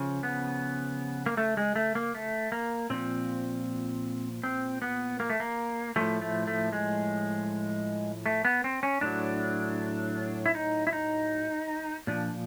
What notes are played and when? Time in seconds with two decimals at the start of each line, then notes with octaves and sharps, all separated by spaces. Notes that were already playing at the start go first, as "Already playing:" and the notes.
Already playing: C#3 F3
0.23 B3
1.26 A#3
1.37 A3
1.57 G#3
1.76 A3
1.95 A#3
2.15 A3
2.52 A#3
2.90 A#2 F3 C4
4.43 C4
4.82 B3
5.20 A#3
5.30 A3
5.40 A#3
5.96 A2 F3 A3
6.22 A3
6.47 A3
6.73 G#3
8.26 A3
8.45 B3
8.64 C4
8.83 C#4
9.01 A2 F#3 D4
10.46 E4
10.55 D#4
10.87 E4
10.93 D#4
12.07 A#2 F3 D4